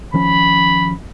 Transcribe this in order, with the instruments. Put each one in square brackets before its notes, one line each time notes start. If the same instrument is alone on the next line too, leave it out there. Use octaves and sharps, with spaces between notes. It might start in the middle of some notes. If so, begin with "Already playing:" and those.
[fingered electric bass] D#3 F3 C#4 [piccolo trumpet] B5